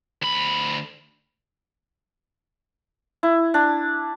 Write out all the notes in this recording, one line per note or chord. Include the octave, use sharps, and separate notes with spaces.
D2 B5
E4
D4